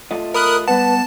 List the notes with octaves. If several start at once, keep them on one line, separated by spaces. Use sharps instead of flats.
A3 F4 D#5
A#4 B5 D#6 F#6
G3 B3 B4 F#5 A5